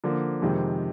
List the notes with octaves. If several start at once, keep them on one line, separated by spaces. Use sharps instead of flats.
D3 F3 A#3
F2 C3 D#3 G#3